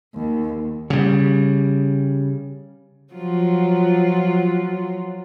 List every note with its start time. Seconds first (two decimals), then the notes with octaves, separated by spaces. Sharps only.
0.15 D#2
0.90 C#3 G3
3.13 F3 F#3 F4